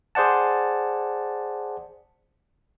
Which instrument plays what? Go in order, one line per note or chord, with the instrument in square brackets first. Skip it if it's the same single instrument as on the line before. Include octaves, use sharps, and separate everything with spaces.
[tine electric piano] G#4 C5 D5 F#5 A5